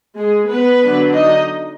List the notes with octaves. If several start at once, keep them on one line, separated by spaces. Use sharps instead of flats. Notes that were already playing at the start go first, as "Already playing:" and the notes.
G#3 G#4
B3 B4
D3 F#3 D4
D#4 D#5